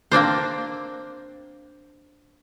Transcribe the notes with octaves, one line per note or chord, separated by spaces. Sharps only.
A#3 C4 D4 C5